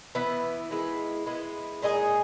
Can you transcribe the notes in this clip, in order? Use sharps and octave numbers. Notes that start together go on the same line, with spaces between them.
E3 B3 E4
D#3 G#3 B3 E4
G#3 B3 E4
A#2 G#3 D#4 G#4